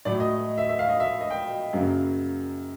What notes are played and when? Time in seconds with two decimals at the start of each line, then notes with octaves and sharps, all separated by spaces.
0.05 A2 F#3 A3 D5
0.20 D#5
0.58 E5
0.69 E5
0.79 F5
0.89 D#5
1.00 E5
1.21 D#5
1.30 G5
1.73 F#2 C#3 F#3 A#3